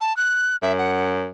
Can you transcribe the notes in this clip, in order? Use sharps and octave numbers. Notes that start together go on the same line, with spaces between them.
A5
F#6
F#2 E5
F#5